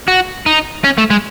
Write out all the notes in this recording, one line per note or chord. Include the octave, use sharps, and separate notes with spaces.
F#4
D#4
C#4
A3
G#3